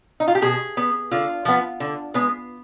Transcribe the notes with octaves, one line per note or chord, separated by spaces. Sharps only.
D#4
F4
G4
B2 G#4
B3
D3 F4
F3 B3
D3
G#3 B3